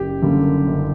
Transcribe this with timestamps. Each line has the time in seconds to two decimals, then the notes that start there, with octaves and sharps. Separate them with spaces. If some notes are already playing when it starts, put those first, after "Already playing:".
Already playing: F#1 G4
0.22 F#2 D3 G3 A#3
0.67 F#1